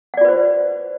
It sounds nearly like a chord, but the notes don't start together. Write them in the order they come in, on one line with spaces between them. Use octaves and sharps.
F#5 D5 F4 B4 C5